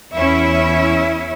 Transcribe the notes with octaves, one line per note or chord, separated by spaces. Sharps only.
E2 C#4 E4 E5